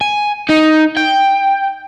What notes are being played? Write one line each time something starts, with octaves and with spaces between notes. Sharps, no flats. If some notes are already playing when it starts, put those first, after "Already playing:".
G#5
D#4
G5